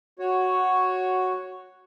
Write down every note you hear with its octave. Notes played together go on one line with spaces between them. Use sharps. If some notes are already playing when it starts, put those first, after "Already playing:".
F#4 C#5